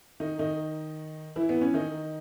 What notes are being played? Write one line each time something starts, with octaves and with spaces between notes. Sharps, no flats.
D#3 D#4
D#3 D#4
E3 E4
B3
C#4
D#3 D#4